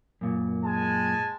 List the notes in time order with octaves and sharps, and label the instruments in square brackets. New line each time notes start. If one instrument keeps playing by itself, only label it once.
[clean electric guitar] F#2 A#2
[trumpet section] G#3 G#5 A5